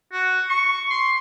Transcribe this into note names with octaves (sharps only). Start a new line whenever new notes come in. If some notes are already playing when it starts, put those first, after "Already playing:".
F#4
C#6
C6